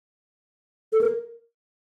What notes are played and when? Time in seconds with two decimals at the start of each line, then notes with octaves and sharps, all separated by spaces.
0.92 A4
1.01 A#4